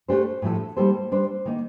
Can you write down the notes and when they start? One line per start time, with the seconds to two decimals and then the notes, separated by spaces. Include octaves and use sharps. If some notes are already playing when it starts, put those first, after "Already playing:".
0.08 A3 D4 G4 C5
0.42 A2 F3 A3 D4 A4
0.77 G3 A#3 D#4 A4 C5
1.11 G3 D4 G4 C5
1.45 D#3 A#3 D#4